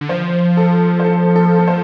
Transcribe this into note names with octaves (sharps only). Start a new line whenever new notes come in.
D3
F3 C5
A4
C5
A4
A4
A4
C5